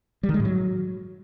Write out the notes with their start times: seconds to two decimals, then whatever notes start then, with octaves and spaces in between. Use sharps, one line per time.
0.23 G3
0.29 D#3
0.34 G#3
0.40 A2
0.45 F#3